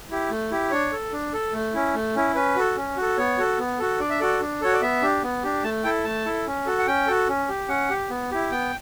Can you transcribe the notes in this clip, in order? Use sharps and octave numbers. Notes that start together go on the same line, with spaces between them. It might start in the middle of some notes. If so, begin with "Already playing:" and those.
E4 G4
A3
E4 G4
D4 C#5
A4
D4
A4
A3
C#4 E4
A3
C#4 E4
C#4 B4
F#4 A4
C#4
F#4 A4
B3 C#5
F#4 A4
B3
F#4 A4
D4 D5
E5
F#4 A4 D5
D4
F#4 A4 C#5
D5
B3 E5
D4 G4
B3
D4 G4
A3 A5
E4 A4 G5
A3 A5
E4 A4
C#4
F#4 A4
F#5
C#4 G5
F#4 A4
C#4
G4
C#4 F#5
G4
B3
E4 G4
B3 G5